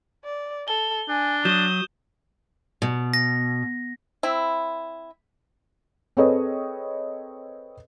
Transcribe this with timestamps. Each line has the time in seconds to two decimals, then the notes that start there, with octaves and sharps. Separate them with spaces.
0.25 D5
0.68 A4 G7
1.09 D4 G#5
1.45 F#3 D#6 G6 E7 G7
2.82 B2
3.14 A#6
4.23 C4 E4
6.17 C4 G#4 A4 B4 C#5 D#5